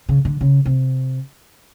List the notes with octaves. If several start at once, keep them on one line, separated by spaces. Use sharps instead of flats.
C#3
D3
C#3
C3